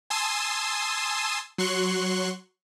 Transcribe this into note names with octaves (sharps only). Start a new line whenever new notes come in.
G#5 A5 C6 D#6 E6
F#3 C6 C#6 F#6